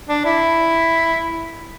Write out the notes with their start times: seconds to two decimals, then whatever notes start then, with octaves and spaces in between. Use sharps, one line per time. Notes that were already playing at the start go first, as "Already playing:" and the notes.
0.09 D4
0.25 E4